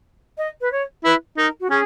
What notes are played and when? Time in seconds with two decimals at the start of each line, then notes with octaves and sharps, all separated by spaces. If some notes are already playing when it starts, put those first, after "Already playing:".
0.38 D#5
0.61 B4
0.72 C#5
1.04 E4 B4
1.37 D#4 A#4
1.60 F#4
1.70 C#4 G#4